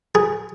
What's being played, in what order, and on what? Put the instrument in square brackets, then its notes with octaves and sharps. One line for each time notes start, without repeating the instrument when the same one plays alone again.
[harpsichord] G#4